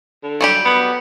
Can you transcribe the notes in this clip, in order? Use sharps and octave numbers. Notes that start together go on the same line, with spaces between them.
D3
F#3 G3 G4
B3